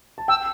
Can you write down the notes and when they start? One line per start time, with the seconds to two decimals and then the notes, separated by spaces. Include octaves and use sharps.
0.18 A5
0.28 G5 E6